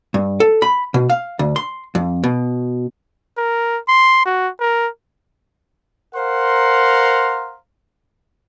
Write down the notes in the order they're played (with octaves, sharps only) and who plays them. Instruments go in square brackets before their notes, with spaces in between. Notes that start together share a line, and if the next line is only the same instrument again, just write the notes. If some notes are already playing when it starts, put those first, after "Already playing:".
[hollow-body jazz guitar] G2
A4
B5
B2
F5
D2
C6
F2
B2
[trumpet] A#4
C6
F#4
A#4
[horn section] A#4 C5 F5 F#5 A#5 C6